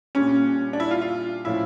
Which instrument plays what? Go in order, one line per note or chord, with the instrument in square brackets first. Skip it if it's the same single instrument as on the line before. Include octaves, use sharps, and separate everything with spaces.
[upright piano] A#2 G3 D4 [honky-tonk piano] C#4
[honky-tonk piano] D4
E4
F4
F4
[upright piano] A2 F3 C#4 F4 [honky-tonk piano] E4